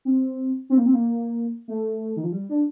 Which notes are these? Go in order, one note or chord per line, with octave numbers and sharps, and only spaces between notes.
C4
C4
A#3
C4
A#3
A3
D#3
F3
G3
D4